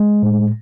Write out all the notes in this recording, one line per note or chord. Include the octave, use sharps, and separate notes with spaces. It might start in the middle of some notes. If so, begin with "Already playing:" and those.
Already playing: G#3
A2